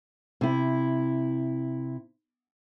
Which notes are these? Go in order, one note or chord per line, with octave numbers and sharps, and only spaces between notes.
C3 E4